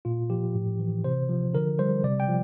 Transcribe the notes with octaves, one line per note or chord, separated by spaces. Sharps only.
A#2 F4
F3 G4
A2
E3
C3 C5
F3
D3 A#4
G3 C5
C3 D5
G5
F3